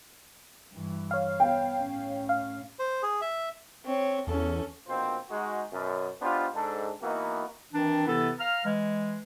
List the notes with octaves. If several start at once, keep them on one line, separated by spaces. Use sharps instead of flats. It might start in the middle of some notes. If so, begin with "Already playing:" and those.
G2 E3
C#5 F5
B3 G5
A2 C#4
F5
C5
G#4
E5
C4 C#5
E2 C#4 A4
A#1 B2 A#3 C4 F4 C5
G#3 D#4 F#4
F#2 B2
B3 D4 D#4 F4 G4 C5
G#2 D4 A4
E3 A#3 B3 D#4 E4 F#4
D#3 E3 C4 D4
C3 E3 B3 E4 A4
F5 A#5 F6
E3 G#3